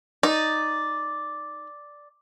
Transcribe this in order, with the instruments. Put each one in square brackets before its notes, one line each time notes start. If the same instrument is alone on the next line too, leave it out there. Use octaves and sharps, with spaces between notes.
[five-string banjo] D#4 [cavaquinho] D5